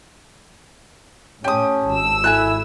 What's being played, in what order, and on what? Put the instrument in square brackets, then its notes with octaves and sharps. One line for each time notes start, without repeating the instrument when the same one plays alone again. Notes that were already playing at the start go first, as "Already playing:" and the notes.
[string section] A2 [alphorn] C#4 [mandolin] G4 D#6 [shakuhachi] A5
[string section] G#1 E6
[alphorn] E4 [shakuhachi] A4 [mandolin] G#5 A5 F#6